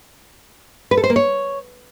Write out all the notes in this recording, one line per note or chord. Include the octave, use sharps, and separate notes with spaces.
B4
A4
C5
A#3
C#5